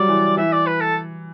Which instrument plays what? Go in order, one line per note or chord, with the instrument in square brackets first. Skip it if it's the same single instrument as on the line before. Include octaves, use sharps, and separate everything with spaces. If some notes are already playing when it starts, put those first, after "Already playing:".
Already playing: [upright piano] F#3 G3 [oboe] D5
[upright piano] E3
[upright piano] E3 [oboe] E5
[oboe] D5
B4
A4